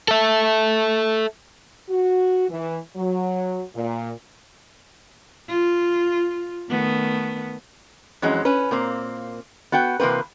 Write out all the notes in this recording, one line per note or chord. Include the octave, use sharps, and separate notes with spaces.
A4 E5
F#4
E3
F#3
A#2
F4
D#3 A3 B3
F2 E3 F#3 G#3 C#4
C#4 B4
A#2 A#3 C4
B3 F#4 F#5 G5
C3 E3 A#3 C4 B4